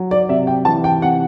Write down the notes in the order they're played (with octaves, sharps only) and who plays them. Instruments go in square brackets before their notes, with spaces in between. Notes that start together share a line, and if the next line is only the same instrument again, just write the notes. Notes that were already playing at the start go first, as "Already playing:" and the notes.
Already playing: [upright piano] F#3
D5
C3 E5
G5
E3 A5
G5
C3 F#5